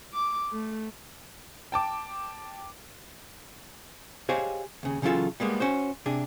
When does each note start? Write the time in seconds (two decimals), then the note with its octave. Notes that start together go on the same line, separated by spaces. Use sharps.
0.14 D6
0.52 A3
1.72 G5 A5 D6
4.29 G4 G#4 C5 C#5 D#5 F5
4.83 D#2 C#3
5.02 C#3 E3 F#3 C#4 F4 A4
5.40 G3 G#3 A#3 B3
5.60 C#4 F#4 C5
6.06 C3 D4 G#4